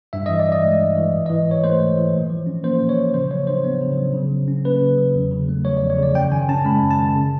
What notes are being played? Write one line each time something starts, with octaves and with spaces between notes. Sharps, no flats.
G2 E5
E3 D#5
D5
G2
D#5
G#3
G2
E3
G#2
D#5
E3
G#2 C#5
A3 C5
G#2
E3
A#2
F3
C#4
A#3 C5
A#2
C#5
F3
C#3 C5
F#3 C#5
D4 C5
B3
C#3
F#3
C#3
F#3
C#4
A#3 B4
C#3
F#3
E2
C#3
A3
F3 C#5
D5
E2
C#5
C#3 D5
F#2 G5
D#3 G#5
C#4 A5
G#3 B5
F#2
A5
D#3
C#3